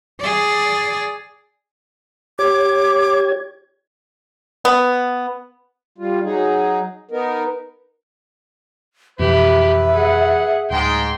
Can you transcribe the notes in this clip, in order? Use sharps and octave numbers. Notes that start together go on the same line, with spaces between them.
G#4 D5
G4 C#5 D6 G#6
B3
G3 F4
F#3 D#4 G#4
B3 D#4 A#4
F2 B2 E3 G4 B4 E5 B5
G#4 F#5
D1 G#2 G5 C6